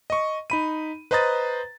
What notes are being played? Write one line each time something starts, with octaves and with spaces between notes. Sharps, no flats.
D#5 C#6
D#4 B5 D#7
B4 C5 D#5 A#5 D#6 A6